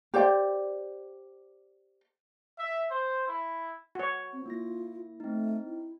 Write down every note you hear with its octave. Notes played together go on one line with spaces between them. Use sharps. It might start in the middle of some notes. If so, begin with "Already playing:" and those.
G4 C5 D5 G5
E5
C5
E4
F#4 C#5
C4
A#3 E4 F4 A#6
A3 C4 D#4
E4